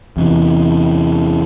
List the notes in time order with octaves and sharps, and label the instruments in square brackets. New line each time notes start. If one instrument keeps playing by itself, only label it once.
[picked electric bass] E2 C3 E3